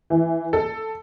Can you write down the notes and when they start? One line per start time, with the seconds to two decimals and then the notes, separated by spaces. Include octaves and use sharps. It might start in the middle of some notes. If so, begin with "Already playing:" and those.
0.10 E3
0.53 A4